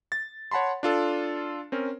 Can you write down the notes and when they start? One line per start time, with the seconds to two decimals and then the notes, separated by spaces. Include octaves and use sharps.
0.12 A6
0.51 C#5 F#5 A5 B5 C6
0.83 D4 F4 A4
1.72 C4 C#4 A#4